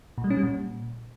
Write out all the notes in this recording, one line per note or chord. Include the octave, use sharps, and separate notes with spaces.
A#2
G3
C#4
G3
A#2